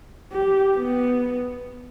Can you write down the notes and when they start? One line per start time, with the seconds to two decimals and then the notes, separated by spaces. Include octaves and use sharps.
0.32 G4
0.76 B3